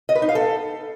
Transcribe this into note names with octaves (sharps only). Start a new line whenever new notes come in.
D#5
B4
D#4
F5
A4